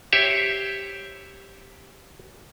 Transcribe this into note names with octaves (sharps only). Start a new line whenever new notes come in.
G4 C5 C#5 E5